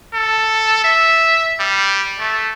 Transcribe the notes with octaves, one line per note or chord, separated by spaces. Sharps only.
A4
E5
G3
A3